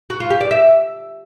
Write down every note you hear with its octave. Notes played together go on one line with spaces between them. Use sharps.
F#4
F4
G4
D5
E5